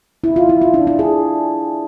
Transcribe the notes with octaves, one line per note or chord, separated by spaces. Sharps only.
E4
F4
E4
F4
D4
D4
G#4